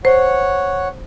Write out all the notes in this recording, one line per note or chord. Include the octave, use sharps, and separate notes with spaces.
C5 C#5 F#5